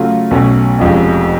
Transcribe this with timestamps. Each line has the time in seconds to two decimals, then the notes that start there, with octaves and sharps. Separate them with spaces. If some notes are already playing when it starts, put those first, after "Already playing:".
Already playing: C#3 F#3 A3 F4
0.31 B1 B2 A3 C#4
0.79 F1 F2 F3 G#3 C#4